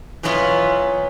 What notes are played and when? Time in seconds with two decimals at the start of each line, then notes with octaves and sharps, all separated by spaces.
0.23 B2 E3 F#3 B3 E4 F4